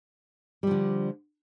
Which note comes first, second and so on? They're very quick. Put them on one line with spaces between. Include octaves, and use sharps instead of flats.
G3 F3 D3